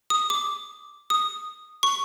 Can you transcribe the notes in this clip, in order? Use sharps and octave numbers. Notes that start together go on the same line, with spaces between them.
D#6
D6
D#6
C#6